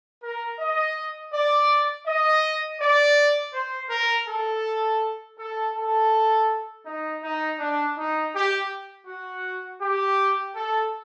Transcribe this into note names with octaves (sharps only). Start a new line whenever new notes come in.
A#4
D#5
D5
D#5
D5
C5
A#4
A4
A4
A4
D#4
D#4
D4
D#4
G4
F#4
G4
A4